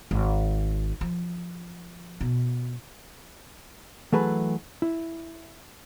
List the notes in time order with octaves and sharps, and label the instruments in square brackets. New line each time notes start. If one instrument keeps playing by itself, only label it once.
[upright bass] G#1
F3
B2
[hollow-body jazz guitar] E3 F#3 A3 G#4 B4
E4